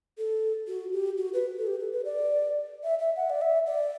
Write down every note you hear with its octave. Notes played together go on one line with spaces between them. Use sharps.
A4
F#4
G4
F#4
B4
A4
G4
A4
B4
D5
E5
E5
F#5
D5
E5
D5